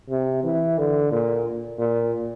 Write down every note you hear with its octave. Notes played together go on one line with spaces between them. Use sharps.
C3
E3
D3
A#2
A#2